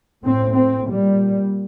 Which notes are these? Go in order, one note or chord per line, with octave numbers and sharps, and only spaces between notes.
A2 C4
C4
A#2 G3